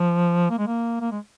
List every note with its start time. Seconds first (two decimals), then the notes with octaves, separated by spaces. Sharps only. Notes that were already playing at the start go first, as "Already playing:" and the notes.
Already playing: F3
0.50 A#3
0.59 G#3
0.67 A#3
1.01 A#3
1.11 G#3